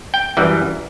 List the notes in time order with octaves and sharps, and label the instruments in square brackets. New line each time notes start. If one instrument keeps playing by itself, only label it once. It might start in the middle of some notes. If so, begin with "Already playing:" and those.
[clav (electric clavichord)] G5
F#2 E3 G3